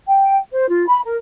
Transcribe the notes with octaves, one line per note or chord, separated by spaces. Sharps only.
G5
C5
F4
B5
A#4